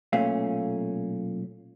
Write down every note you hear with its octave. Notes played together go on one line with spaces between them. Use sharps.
B1 A#2 A3 C#4 F5